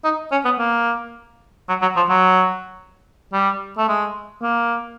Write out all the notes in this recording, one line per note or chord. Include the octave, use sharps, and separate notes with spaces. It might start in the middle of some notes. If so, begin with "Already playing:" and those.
D#4
C#4
B3
A#3
F#3
F#3
F3
F#3
G3
A3
G#3
A#3